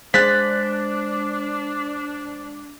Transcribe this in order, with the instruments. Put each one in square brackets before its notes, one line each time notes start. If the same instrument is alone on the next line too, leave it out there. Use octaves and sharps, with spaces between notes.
[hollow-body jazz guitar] G#3 G#4 F5 [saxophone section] D4 [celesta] C5 [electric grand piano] F#6 A6 B6